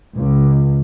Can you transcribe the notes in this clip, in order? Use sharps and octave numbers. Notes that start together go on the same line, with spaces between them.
C#2